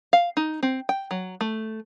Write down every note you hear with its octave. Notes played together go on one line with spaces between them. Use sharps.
F5
D#4
C4
G5
F#3
A3